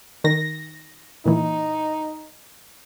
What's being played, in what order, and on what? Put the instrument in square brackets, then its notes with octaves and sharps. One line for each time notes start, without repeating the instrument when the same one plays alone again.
[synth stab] D#3 A#6
[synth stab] A#2 E3 [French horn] D#4